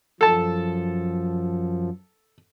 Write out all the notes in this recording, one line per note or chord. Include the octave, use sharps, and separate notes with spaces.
F#2 F3 A4 A5